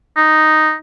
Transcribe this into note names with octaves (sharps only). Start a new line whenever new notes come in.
D#4